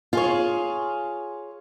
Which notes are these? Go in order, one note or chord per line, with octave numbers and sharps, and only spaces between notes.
F4 G#4 C#5